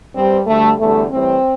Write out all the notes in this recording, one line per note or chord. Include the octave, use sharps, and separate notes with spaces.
G2 G3 C4
D2 D3 G3 A3
E2 D3 G3 A3
A2 E3 G3 C4